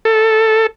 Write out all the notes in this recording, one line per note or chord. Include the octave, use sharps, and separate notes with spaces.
A4